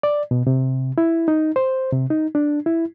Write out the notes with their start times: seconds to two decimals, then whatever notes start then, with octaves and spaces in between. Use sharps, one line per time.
0.03 D5
0.31 B2
0.47 C3
0.98 E4
1.28 D#4
1.56 C5
1.93 C3
2.10 D#4
2.35 D4
2.66 E4